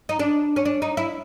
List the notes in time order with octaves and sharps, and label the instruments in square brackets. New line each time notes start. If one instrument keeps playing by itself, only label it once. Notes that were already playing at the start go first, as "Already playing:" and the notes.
[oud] D#4
D4
C#4
D4
D#4
E4